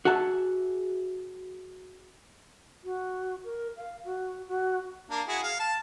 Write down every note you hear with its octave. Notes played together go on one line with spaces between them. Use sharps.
F#4 G#4 E5 A5
F#4
A#4
F5
F#4
F#4
A#3 D4
E4 F#4 G#4
F5
A5